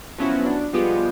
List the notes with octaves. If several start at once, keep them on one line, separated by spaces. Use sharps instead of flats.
F3 F#3 B3 C#4 E4 F#4
D4
F3 G3 G#3 B3 F4 G4